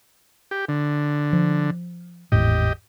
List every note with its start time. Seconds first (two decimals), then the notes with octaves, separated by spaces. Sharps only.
0.51 G4
0.69 D3
1.33 F3
2.32 G#1 E2 A2 G4 D#5